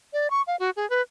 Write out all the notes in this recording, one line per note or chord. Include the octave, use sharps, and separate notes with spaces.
D5
C#6
F5
F#4
G#4
B4